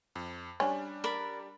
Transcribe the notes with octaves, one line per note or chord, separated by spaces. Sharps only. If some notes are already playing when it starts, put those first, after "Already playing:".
F2
G3 C#4 D4
A#4 D5 B5